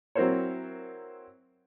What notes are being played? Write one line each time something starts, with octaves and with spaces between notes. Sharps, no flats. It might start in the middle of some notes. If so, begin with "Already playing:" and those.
F#3 C4 E4 A#4 C5 C#5